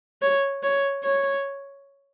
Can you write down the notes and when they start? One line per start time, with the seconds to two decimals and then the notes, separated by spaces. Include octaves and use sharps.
0.22 C#5
0.63 C#5
1.04 C#5